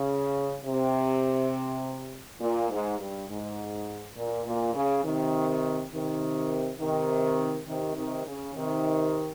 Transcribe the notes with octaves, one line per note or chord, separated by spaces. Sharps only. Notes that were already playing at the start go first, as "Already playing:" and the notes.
Already playing: C#3
C3
A#2
G#2
G2
G#2
A#2
A#2
C#3
C3 D#3
C3 D#3
C3 D#3
C3 D#3
C3 D#3
C#3
C3 D#3